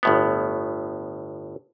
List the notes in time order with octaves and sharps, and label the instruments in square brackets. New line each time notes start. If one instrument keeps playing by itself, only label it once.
[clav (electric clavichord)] G1 A2 B3